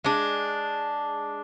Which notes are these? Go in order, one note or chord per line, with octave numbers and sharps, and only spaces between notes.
G#3 D4